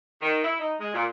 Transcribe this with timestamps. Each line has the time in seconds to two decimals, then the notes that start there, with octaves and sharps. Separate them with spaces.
0.22 D#3
0.44 E4
0.60 D#4
0.80 G#3
0.94 A#2